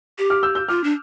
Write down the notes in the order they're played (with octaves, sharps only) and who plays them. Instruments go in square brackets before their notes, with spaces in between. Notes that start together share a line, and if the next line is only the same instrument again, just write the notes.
[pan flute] G4
[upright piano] D6 F6
E6 G6
E6 G6
[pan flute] F4 [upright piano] D6 F6
[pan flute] D4